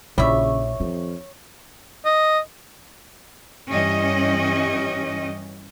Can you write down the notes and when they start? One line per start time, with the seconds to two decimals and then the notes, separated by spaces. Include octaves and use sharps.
0.18 A#1 C#3 G3 E4 C#5 E5
0.80 F2 D#3
2.05 D#5
3.70 G2 E3 G3 C#4 G4 D#5